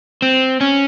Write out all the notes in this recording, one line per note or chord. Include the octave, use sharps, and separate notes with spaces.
C4
C#4